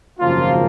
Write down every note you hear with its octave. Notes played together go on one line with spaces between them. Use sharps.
G#1 F#2 C#3 F3 A#3 F4